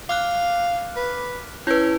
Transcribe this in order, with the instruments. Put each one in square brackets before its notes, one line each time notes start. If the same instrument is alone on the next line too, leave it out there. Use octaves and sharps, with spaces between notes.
[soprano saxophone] F5 [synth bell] D6 F6 F#6
[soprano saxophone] B4
[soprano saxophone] C#4 [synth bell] E4 B4